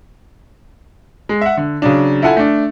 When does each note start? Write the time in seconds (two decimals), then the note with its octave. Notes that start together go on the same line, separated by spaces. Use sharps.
1.29 G#3
1.41 E5 F#5
1.57 D3
1.82 C#3 F#3 D4
2.22 E4 F4 A4 F#5 G#5
2.37 A3 D4